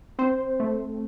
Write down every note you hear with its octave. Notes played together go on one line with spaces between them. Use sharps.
C4 C5
A3